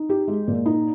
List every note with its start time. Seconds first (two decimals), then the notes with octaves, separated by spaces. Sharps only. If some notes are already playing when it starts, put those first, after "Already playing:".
Already playing: D#4
0.09 G4
0.28 G#3
0.48 A#2
0.66 D#4